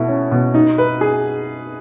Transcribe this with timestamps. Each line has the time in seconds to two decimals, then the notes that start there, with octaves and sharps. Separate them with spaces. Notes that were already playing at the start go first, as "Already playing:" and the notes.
Already playing: B2 A3 E4
0.08 C#4
0.32 B2
0.54 D#4
0.78 B4
1.01 G#4